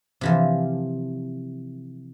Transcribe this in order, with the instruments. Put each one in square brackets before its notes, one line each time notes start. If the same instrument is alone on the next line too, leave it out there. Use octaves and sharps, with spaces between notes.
[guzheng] C3 E3 F3